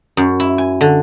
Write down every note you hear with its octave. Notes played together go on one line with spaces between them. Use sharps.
F#2
E4
G#5
D3